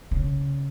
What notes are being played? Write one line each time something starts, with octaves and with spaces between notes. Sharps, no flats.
C#3